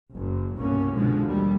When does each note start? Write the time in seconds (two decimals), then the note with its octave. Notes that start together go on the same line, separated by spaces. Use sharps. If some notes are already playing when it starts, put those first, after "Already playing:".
0.15 F#1 F#2
0.56 C2 G2 B2 A#3 C#4
0.95 B2 D3 F3 G#3
1.27 D#2 G3